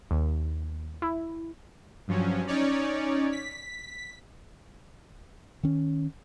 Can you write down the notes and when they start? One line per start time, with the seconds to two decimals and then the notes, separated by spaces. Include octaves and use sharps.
0.11 D#2
1.02 E4
2.08 G2 F3 F#3 C#4
2.47 C#4 D#4 C#5 D5
3.32 B6
5.63 D#3 C#4